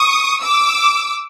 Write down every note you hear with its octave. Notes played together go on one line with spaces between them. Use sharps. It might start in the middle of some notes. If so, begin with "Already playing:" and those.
Already playing: C#6 D#6
D6 E6